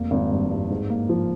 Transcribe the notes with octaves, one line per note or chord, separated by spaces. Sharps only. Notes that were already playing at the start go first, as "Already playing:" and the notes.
Already playing: F1 A#3
G#1
G2
G2
G#2
A#3
F3